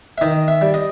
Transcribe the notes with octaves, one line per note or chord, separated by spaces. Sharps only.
E5
D#3 D#5
E5
G3
D#5